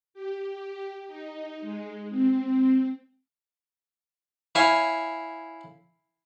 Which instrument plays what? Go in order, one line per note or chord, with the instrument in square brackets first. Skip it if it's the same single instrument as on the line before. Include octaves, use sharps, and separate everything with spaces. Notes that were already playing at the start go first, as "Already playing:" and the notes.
[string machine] G4
D#4
G#3
C4
[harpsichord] E4 C#5 F5 G#5